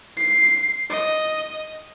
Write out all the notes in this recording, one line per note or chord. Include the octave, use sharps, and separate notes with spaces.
C7
D#5